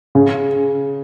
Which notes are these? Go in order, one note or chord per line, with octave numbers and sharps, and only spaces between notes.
C#3